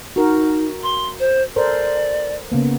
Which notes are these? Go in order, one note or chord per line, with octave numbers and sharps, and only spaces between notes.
D#4 F#4 A#4
C6
C5
A4 A#4 C5 D5
C#3 A#3 B3